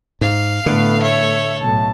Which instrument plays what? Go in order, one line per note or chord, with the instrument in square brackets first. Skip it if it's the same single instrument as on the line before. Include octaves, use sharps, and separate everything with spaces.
[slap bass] G#2 [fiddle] F5
[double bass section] A2 A3 [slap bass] D3 [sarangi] B3
[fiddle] A4 C#5 [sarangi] E5
[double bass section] B1 A2 [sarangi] A5